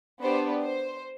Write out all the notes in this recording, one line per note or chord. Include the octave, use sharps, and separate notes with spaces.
B3 D4 G4 C5
C5